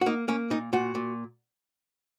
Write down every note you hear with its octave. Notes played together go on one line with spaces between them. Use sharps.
F#4
A#3 D#4
A#3 C#4
A#2 D#4
A#2 F#4
A#2